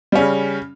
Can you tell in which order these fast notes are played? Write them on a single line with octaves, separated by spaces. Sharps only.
G3 C#4 C#3